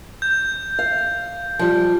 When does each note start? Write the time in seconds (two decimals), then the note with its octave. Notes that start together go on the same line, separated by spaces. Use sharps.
0.22 G6
0.79 F5
1.59 F3 G3